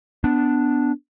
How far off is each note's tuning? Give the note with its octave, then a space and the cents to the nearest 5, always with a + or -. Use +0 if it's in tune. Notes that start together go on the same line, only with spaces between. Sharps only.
B3 +15 D4 +0